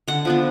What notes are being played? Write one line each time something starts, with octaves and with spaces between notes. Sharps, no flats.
D3 F#5
F3 B3 D4